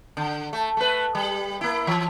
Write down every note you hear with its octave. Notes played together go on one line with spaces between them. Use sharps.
D3
A3
A3 B4
G3
A#3 E4
E3